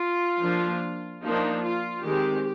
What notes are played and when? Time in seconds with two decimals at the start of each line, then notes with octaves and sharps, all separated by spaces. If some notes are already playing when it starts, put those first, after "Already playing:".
Already playing: F4
0.41 F3 A#3 D4
1.23 F3 A#3 D4 D#4
1.64 F4
2.04 D#3 G#3 C4 G4